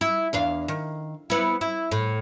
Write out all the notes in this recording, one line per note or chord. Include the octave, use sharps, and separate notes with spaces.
E4
E2 D4 F5
D#3
B3 E4
E4
A2